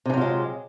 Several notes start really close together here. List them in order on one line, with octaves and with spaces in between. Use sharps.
C3 E3 F#3 F4 G#3